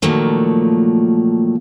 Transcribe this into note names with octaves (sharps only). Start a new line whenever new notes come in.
A#2 D#3 F3 F#3 A3 A#3